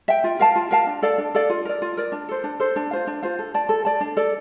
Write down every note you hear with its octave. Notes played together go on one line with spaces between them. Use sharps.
E5 G5
F4
A#4 F5 A5
F4
A#4 F5 A5
D4
A4 D5 F5
D4
A4 D5 F5
F4
A#4 D5
F4
A#4 D5
D4
A4 C5
D4
A4 C5
D4
F4 C5 F5
D4
F4 C5 F5
A4
D5 A5
A4
D5 A5
D4
A4 D5